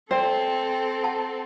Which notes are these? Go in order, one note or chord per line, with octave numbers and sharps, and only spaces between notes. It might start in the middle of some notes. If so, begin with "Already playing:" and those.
C4 A4 C5 D5 E5 G5
F#5 A5